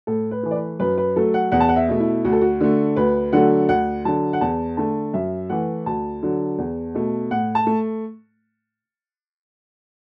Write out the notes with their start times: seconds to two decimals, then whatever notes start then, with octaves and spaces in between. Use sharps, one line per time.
0.07 A2 A4
0.31 B4
0.43 E3 A3
0.51 D5
0.55 B4
0.80 F#2 B4
0.98 B4
1.16 F#3 A3 A4
1.34 F#5
1.52 E2 F#5
1.60 A5
1.69 F#5
1.76 E5
1.88 B2 A3
2.00 E4
2.25 D2 F#4
2.32 A4
2.41 F#4
2.61 D3 A3
2.96 D2 B4
3.33 D3 F#3 A3 F#5
3.69 D2 F#5
4.05 D3 F#3 A5
4.33 F#5
4.41 E2 A5
4.77 D3 A3 A5
5.14 F#2 E5
5.50 E3 A3 F#5
5.86 D2 A5
6.23 D3 F#3
6.58 E2
6.95 B2 A3
7.31 A2 F#5
7.55 A5
7.67 A3